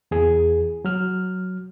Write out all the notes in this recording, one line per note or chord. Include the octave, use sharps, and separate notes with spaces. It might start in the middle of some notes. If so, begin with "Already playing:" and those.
E2 G#4
F#3 F6